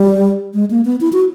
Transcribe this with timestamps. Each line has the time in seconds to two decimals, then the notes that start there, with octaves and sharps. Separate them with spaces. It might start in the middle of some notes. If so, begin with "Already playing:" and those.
Already playing: G3
0.54 G#3
0.71 A#3
0.85 B3
1.01 E4
1.13 F#4